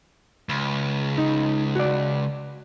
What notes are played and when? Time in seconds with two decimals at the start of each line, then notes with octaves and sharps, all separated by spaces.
0.49 C#2
1.18 D#4
1.76 F#4 D5